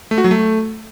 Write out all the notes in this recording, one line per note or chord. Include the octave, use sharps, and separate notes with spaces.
A3
F#4
F#3
A3